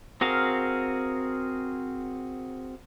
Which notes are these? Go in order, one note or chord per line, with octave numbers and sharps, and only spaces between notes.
C4 F#4 G#4 A#4 F5